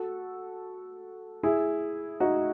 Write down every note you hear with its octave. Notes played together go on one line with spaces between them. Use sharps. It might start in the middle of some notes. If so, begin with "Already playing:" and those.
Already playing: F#4 A4
E4 G#4
D#4 F#4